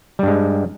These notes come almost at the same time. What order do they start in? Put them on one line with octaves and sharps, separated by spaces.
G3 G2 G#3